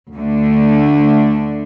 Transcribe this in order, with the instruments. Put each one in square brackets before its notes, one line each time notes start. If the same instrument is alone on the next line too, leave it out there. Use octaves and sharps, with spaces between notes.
[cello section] D2 D3 A3 D4